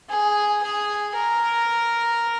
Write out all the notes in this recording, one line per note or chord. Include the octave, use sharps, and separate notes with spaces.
G#4
G#4
A#4